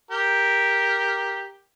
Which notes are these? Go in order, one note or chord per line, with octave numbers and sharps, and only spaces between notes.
G4 A#4